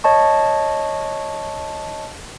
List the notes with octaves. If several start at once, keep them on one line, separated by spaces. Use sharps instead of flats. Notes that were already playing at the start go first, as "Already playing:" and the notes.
C#5 D#5 A5 C#6